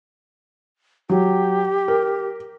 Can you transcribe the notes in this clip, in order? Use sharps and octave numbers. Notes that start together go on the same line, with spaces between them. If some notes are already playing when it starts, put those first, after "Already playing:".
F#3 G4
A#4